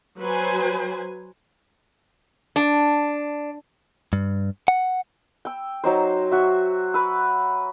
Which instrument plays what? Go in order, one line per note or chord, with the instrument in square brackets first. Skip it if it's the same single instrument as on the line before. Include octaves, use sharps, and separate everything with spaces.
[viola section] F#3 B4 C5 G#5
[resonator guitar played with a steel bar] D4
[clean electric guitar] G2
F#5
[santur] G5 E6
F#3 D#4 C5
F#4 E5
B4 E6